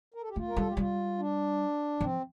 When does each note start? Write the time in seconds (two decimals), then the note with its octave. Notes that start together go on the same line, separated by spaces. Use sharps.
0.14 A#4
0.22 A4
0.29 G4
0.36 A3 F4
0.48 A#4
0.57 G3 A4
0.67 G4
0.77 G3 F4
1.19 D4
2.01 F3 C4